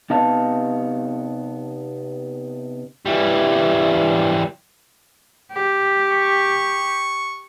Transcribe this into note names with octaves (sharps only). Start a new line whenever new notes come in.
C3 B3 D#4 F5 A5
E3 G3
G4
C#6